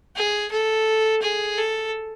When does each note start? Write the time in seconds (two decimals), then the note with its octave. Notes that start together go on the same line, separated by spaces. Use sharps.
0.16 G#4
0.51 A4
1.22 G#4
1.57 A4